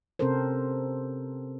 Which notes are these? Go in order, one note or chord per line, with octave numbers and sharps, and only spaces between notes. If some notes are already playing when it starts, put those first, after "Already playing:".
C3 C4 C#4 A4 A#4 C5